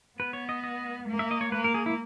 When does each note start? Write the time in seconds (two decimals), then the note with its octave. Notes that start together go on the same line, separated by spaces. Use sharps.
0.19 B3 B4
0.33 C#5
0.49 D#5
0.64 D#5
1.09 A#3
1.19 E5
1.31 D#5
1.41 C#5
1.52 A#3 B4
1.64 A#4
1.74 G#4
1.86 E4